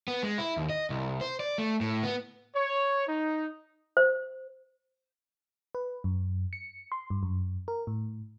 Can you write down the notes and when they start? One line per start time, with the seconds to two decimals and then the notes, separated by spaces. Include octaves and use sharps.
0.08 B3
0.23 G#3
0.38 E4
0.57 D#2
0.70 D#5
0.90 C2
1.21 C5
1.40 D5
1.58 A3
1.81 A2
2.03 B3
2.55 C#5
3.07 D#4
3.97 C5
5.75 B4
6.04 F#2
6.53 C#7
6.92 C6
7.10 G2
7.23 F#2
7.68 A#4
7.87 A2